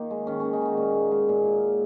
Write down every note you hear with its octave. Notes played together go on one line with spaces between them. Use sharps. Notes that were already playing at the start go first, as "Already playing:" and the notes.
Already playing: D#3 A#3 D#4 F4 A#4
G#3
D#3 C#4
D#3 C#4
D#4
G#3 F#4
A#2
G#3
G#3
A#2
A#2
G#3